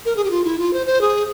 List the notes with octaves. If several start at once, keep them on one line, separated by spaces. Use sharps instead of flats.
A#4
G#4
G4
F4
E4
F4
C5
C5
G#4